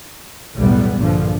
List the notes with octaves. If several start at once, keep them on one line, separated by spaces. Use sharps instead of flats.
B1 E2 A2 G3 B3
A#1 G2 D3 F3